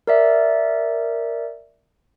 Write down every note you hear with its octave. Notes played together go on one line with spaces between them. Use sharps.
A#4 D5 E5